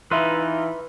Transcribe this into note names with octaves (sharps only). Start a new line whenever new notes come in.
E3 D#4 F4 B4 E5 B5 C6